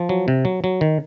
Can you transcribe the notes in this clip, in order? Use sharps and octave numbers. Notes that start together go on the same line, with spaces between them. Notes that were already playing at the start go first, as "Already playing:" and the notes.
Already playing: F3
F#3
C3
F#3
F#3
D#3